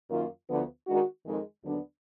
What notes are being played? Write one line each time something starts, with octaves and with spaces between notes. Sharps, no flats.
F#2 D#3 A#3 F4
D2 D3 F3 B3
D#3 G#3 D4 F#4
F2 D#3 G#3
D#2 D3 F#3 B3 D4